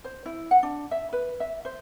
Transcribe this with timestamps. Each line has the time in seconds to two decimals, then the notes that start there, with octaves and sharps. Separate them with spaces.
0.04 C5
0.26 E4
0.51 F#5
0.63 D4
0.91 E5
1.13 B4
1.40 E5
1.65 C5